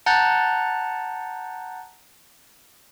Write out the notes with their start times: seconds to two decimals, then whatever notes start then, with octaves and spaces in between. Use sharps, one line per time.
0.06 F#5 A5 A#5 F#6 G6 A6